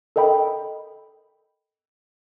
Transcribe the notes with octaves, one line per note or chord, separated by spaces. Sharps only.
A4 A#4 D#5 G5 B5